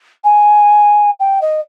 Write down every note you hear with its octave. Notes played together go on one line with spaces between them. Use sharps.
G#5
G5
D#5